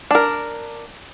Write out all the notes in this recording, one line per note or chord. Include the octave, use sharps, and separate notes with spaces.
D4 A#4